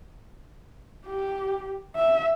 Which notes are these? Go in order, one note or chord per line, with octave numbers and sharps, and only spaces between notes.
G4
E5